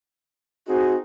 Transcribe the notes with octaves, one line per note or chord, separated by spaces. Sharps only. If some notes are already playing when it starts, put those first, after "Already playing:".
C4 D#4 F#4 G#4